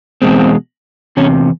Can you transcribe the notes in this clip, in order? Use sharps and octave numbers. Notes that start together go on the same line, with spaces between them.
E2 B2 G#3 C4
E2 C3 C#4